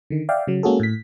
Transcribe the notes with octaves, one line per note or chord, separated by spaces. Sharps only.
D3 D#3
D5 E5 F5 G5
C#3 F#3
G#3 A#3 C#4 F#4 G#4 A4
A2 B6